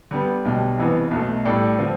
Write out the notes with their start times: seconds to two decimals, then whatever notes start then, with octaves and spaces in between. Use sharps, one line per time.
0.11 D3 G3 B3
0.45 B1 B2 G3
0.78 F1 F2 E3 B3
1.11 B1 B2 A3
1.45 A2 G3 D4 A4 D5
1.79 D3 F3 C4